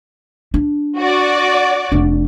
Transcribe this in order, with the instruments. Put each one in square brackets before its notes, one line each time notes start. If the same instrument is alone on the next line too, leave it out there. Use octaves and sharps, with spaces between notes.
[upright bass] D4
[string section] F#4 D5
[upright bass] F1 D4